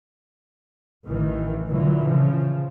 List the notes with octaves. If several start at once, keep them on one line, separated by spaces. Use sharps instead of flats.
A1 D#3 E3
A#2 D3 E3 F#3
C#3 F3